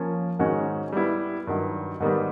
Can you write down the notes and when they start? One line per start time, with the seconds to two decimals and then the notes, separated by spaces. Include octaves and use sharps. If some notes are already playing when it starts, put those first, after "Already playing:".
Already playing: F3 A#3 C#4
0.39 G#2 D#3 G#3 C#4 F#4
0.92 G3 B3 E4
1.47 G2 D#3 F#3
2.00 G#2 D#3 G3 B3